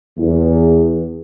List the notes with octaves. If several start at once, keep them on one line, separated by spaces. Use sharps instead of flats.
E2